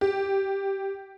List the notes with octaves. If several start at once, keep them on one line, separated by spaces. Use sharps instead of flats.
G4